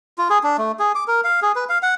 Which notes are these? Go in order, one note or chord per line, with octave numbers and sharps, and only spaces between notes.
F4
G#4
D4
A3
G#4
D6
A#4
F5
G#4
B4
F5
F#5